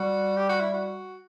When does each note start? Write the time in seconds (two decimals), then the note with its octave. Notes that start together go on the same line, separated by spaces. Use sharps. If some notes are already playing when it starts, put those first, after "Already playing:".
Already playing: G3 F#4
0.36 G4
0.49 F#4
0.60 E4
0.74 F#4